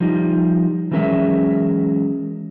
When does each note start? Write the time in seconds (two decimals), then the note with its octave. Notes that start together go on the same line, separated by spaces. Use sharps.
0.01 F3 G3 D#4
0.91 E3 F#3 G#3 C#4 A#4 E5